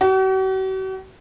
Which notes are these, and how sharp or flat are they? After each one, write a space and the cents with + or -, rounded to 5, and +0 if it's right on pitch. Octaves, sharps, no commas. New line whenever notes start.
F#4 +45